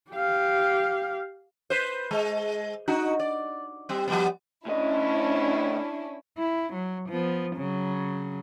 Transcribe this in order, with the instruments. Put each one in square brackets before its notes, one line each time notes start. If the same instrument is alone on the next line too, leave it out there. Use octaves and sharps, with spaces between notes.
[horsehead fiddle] G4 F5
[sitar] B4 C5
G#3
D4 D#4 F#4
D5
G3 C4
F3 G3 B3
[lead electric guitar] A2 D#5 [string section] C#4 D4 E4
[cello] E4
F#3
F3 B3
C#3 F#3